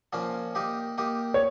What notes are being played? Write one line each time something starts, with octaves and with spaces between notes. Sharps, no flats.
A#2 F3 A#3 C#4
A#3 D#4 G4
A#3 D#4 G4
C#5